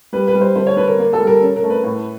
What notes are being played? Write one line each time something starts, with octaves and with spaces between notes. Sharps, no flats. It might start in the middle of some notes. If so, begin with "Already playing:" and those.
G3 B4
B4
G3
C5
D3 C5
C#5
D3 B4
A#4
A#3
A4
G3
A#4
C#4
A#4
A3
B4
A2